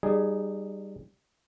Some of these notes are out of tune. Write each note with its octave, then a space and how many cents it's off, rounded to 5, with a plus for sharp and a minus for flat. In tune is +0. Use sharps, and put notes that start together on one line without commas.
G3 +0 D#4 -25 G#4 +0